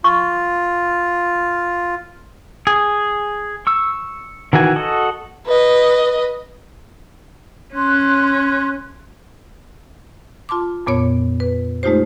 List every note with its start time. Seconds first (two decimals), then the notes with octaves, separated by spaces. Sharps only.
0.04 F4 C#6
2.67 G#4
3.67 C#6 E6
4.53 D#3 E3 F#4 G#5
4.76 F#4 A4 D#5
5.47 B4 D#5
7.74 C#4 C6 F#6
10.49 F4 A5 C6 D6
10.87 F2 A#2 B3 C#5
11.40 B4
11.83 G#3 A3 D#4 F4 G4 C5